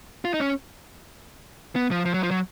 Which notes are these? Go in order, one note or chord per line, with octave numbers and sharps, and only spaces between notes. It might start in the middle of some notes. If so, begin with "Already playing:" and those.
F4
D#4
C#4
B3
F3
F3
F#3
F3
F#3